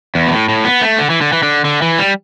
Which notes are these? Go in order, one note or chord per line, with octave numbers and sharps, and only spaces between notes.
E2
B2
A2
A2
B3
A3
D3
E3
D3
E3
D3
D3
E3
G3